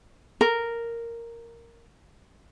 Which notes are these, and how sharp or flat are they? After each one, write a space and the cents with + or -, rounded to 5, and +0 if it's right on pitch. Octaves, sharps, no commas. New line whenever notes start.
A#4 -5